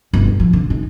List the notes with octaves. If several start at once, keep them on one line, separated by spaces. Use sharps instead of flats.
G1
F#2
F3
D3
D#4